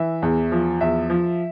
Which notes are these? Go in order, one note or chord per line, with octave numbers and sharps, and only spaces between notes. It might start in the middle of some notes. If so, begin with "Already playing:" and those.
Already playing: E3 E5
E2
F3
E2 E5
F3